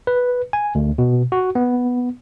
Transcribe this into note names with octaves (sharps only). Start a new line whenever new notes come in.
B4
G#5
D2
B2
F#4
B3